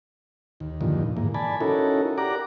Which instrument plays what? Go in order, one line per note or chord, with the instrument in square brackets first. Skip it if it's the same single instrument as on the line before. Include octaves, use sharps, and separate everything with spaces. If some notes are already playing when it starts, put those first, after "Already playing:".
[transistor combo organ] D#2
E2 G2 A#2 D3 D#3 F3
G#2 E3 A#3
D5 G#5 A5 B5
C#4 D#4 E4 F#4 A4 A#4
G4 A#4 D5 F#5 A#5 D6